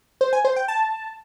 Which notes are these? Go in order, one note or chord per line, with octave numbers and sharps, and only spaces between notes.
C5
G#5
C5
G5
A5